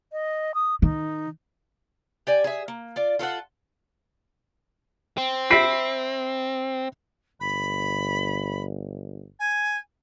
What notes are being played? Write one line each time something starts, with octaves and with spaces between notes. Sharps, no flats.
D#5
D#6
D#3 D#4
G4 D5 G#5
G#4 E5
A#3
F4 D5
F4 A4 C5 F#5
C4
E5 B5 A#6 C7 D7
G1 B5
G#5